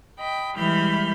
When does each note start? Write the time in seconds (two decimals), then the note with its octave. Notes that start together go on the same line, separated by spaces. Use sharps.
0.19 D#5 G5 B5
0.57 E3 G3 G#3 B5 F6 G6